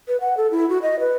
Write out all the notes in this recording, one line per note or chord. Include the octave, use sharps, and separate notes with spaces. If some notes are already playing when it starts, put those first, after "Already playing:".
B4
F#5
A4
E4
F#4
D#5
B4